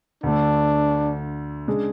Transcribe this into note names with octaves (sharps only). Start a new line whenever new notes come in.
D2 D3 A3 D4
C#3 G#3 D4 G#4